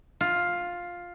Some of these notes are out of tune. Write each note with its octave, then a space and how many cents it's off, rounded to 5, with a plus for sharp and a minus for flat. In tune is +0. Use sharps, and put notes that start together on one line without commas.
F4 +10